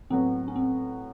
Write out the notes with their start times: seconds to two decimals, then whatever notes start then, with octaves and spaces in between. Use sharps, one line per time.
0.10 A2 F#3 B3 C4
0.48 C#4
0.56 C4